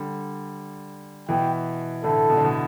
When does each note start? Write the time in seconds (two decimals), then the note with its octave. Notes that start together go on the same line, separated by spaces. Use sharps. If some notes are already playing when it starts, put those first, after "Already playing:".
Already playing: D3 G3
1.29 B2 E3 G5
2.04 A2 D3 A4
2.30 B2
2.37 D3
2.44 B2